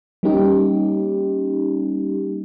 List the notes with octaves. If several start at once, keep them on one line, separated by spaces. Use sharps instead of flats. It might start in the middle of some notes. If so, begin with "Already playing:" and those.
G3 A#3 C#4 D#4 G4